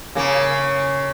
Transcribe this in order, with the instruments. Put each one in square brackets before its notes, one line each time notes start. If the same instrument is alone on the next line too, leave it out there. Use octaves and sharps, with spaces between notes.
[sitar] C#3 A#3